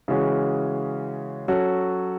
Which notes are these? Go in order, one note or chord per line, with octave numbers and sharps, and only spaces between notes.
C#3 E3 G#3 C#4 F#4
F#3 C#4 F#4 A4